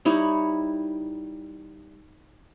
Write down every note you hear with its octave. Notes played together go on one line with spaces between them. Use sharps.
G3 D#4 E4 C#5